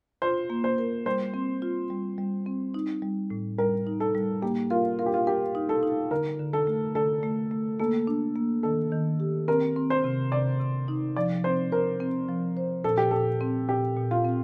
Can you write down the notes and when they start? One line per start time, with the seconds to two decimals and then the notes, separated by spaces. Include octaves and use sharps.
0.22 F4 C5
0.50 A#3
0.64 C5
0.78 A#4
1.06 G3 C5
1.34 C4
1.62 F4
1.90 G3
2.18 G3
2.46 C4
2.74 D#4
3.02 G3
3.30 A2
3.58 G3 A#4
3.87 D#4
4.00 A4
4.15 G3
4.42 A#3 G4
4.70 F4 A#4
4.99 F4 A#4
5.06 G4
5.14 F4
5.27 G4 A#4
5.55 D#4
5.69 A4
5.83 D#4
6.11 D3 A#4
6.40 D3
6.53 A4
6.67 A3
6.95 D3 A4
7.23 A3
7.51 A3
7.80 A#3 A4
8.07 D4
8.36 A#3
8.63 D#3 A4
8.92 D#3
9.20 G4
9.48 C4 A#4
9.76 C4
9.90 C5
10.04 C3
10.32 C3 D5
10.60 C3
10.88 D#4
11.16 F3 D5
11.44 C4 C5
11.72 A#4 C5
12.00 C4
12.29 F3
12.57 C5
12.84 A#2 A4
12.98 G4
13.11 A#2 A4
13.41 C4
13.69 A#2 G4
13.97 A#2
14.11 F4
14.25 C4